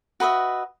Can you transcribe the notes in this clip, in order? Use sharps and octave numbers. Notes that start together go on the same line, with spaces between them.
F#4 B4 D#5 E5